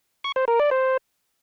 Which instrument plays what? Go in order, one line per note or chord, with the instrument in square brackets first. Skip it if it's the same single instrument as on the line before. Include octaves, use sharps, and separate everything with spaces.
[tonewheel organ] C#6
C5
A#4
D5
C5